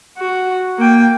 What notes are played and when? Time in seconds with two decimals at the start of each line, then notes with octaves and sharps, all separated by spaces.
0.18 F#4
0.78 A#3 G5